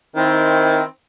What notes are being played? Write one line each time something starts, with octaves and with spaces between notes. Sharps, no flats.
D#3 C4 E4